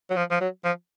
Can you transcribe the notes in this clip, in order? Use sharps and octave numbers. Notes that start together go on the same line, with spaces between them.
F#3
F3
F3
F#3
F3